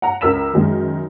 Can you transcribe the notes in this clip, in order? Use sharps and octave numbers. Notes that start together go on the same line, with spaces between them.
F#5 A#5
C#2 A#4 E6 B6 E7
F#2 D#3 G#3